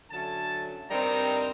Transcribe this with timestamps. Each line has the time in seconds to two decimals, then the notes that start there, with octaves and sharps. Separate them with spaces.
0.10 D3 F#3 A3 C#4 A5
0.90 G2 D#3 G3 C4 D#4 A#5